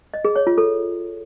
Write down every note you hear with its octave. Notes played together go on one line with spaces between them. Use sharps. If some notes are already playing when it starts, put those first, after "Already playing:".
D#5
G#4
C#5
F4
A4